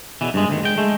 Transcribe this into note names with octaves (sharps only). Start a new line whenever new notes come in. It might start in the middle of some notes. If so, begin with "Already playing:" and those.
E2 B2 E3
G2 G#3
D2 D#3
G#3 G5
G#3 A3